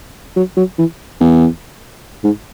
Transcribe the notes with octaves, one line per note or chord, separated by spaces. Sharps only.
F#3
F#3
E3
E2
G#2